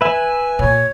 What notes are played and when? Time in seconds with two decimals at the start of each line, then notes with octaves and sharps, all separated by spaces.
0.01 B4 E5 G#5
0.59 A#2 C#5